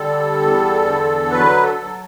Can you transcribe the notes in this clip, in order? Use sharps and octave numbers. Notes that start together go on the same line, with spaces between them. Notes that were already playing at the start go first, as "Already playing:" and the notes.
Already playing: D3 G3 A4
E2
D3
F#3 B4
A4
F#3